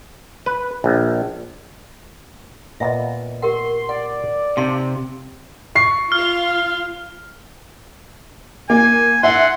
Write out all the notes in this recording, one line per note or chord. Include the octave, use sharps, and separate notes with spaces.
B4
A#1
A#2 B3 D#5 E5
G4 A#4 F#5 C6
D5 F#5
C3 D#4 F5 C6
C#6 C7
F4 F5 F6
A#3 G#5
E5 F#5 C6